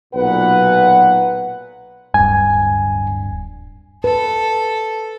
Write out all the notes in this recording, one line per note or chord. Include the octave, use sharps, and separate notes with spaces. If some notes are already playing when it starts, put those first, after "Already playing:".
B1 A#2 B4 F#5
D1 G2 G#5
A4 B4